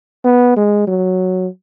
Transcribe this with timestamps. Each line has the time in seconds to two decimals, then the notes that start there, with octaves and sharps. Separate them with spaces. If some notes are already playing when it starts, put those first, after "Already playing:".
0.24 B3
0.56 G#3
0.87 F#3